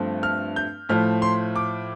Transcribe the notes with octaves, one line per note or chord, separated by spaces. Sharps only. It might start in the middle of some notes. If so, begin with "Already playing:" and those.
Already playing: G2 F3 A3 C4
F6
G6
A2 F3 A3 F6
C6
D6